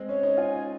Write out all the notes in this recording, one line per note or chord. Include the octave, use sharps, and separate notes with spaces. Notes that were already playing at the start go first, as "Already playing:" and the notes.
Already playing: G#3 C4
C#4 C#5
D#4
F4 G#5